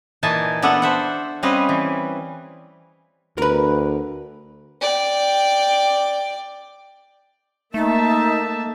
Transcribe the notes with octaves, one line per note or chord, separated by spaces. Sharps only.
A#2 E3 D#4 G#5 A5
B3 D4 A4 E5 F#5
C5 E5 F#5
G3 C4 C#4 B4 D#5 F5
E3
D2 A#4 B4
D5 G5
A3 A#3 D#4 E5 A5